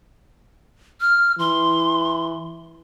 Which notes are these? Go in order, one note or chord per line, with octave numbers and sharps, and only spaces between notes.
F6
E3 C6